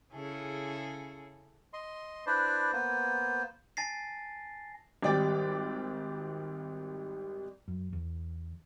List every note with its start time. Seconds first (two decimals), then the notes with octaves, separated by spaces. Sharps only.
0.13 C#3 C#4 E4 G#4 A4
1.73 D#5 C6
2.27 D4 E4 B4 C5 D5
2.73 A#3 B3 C5
3.77 G#5 A5 A6 A#6 C7
5.02 G#1 G3 D5 G5 D6 A6
7.68 F#2
7.93 E2